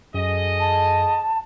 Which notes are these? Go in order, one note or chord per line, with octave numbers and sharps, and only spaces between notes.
F#2 G#4 A4 D#5
A5